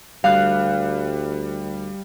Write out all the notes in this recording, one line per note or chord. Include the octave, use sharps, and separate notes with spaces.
D2 G3 F5 F#6